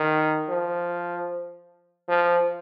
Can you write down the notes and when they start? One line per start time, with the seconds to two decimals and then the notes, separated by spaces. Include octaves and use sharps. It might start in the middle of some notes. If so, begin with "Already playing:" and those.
Already playing: D#3
0.49 F3
2.09 F3